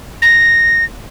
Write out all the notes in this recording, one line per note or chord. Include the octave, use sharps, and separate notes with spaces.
A#6